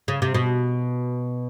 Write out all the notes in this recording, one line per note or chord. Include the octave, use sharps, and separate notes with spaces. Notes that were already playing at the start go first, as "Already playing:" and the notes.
C#3
C3
B2